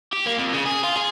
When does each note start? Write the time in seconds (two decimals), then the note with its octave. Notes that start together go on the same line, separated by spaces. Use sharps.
0.13 G4
0.26 A#3
0.38 F2
0.53 C#3
0.65 G#4
0.84 F4
0.98 G#4